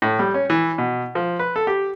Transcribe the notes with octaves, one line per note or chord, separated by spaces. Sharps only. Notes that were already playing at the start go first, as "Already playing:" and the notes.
A2
G3
C#4
E3
B2
F3
B4
A4
G4